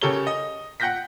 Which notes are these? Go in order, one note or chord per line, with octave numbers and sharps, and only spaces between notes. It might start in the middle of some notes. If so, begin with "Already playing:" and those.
C#3 G4 A4 A#4 C#5 G7
D#5
F#5 G5 F#6 G6 A#6 B6